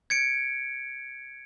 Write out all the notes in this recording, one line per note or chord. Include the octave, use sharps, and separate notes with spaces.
G#6 C#7 D7